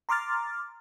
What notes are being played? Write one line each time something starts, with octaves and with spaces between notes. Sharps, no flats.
A#5 C6 D6 F6 A6